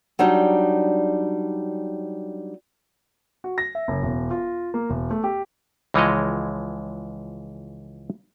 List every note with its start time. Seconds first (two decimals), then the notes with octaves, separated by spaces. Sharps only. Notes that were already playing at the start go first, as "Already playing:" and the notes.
0.19 F#3 G3 D4 D#4
3.44 F#4
3.58 A#6
3.75 E5
3.88 F#1
4.03 E1
4.31 F4
4.74 A#3
4.90 E1
5.11 A3
5.24 G4
5.94 C#2 E3 F3 G#3 C#5 D#5